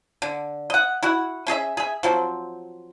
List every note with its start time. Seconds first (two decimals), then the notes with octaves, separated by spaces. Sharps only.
0.22 D3
0.70 D#5 F#5
1.03 E4 F#4 F#5
1.47 C#4 G#4 D#5 E5
1.77 G#4 E5
2.03 F3 F#3 C4